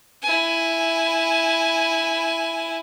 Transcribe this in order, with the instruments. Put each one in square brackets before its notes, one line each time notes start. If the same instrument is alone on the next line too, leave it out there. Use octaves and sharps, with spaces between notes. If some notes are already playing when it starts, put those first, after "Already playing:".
[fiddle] E4 G#5